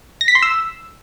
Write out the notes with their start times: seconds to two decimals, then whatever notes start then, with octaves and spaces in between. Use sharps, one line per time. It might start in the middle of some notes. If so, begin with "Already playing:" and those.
0.21 A#6
0.28 B6
0.35 C6
0.42 E6